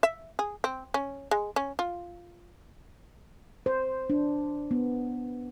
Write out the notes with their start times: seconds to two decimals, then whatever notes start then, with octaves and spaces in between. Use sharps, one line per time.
0.03 E5
0.39 G#4
0.64 C4
0.94 C#4
1.31 G#3
1.56 C#4
1.79 F4
3.66 C5
4.10 D4
4.71 B3